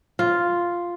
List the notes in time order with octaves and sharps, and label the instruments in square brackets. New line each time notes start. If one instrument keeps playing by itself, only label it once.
[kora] F4